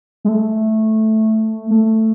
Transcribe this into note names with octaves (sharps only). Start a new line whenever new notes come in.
G#3
A3
A3